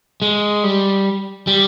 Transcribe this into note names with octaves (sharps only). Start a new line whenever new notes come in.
G#3
G3
G3